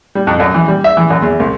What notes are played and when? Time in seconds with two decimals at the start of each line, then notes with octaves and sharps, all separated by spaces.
0.15 G3
0.27 F2
0.40 F#2
0.54 E3
0.68 G3
0.84 E5
0.97 E3
1.10 F#2
1.22 E2
1.40 C2